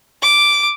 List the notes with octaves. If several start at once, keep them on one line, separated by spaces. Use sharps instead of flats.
D6